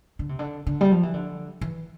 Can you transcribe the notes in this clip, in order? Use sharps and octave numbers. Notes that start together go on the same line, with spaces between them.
D3
C3
D3
D3
G3
F3
E3
D3
E3